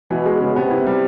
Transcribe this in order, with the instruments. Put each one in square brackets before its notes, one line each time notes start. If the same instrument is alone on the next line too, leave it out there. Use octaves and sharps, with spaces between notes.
[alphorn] B2 [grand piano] E3
[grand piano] G#3
C#3
[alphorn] C3 [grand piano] B3
[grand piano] E4
G3